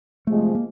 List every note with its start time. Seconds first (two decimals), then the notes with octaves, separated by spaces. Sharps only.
0.27 C3 F3 G#3 A3
0.55 A#3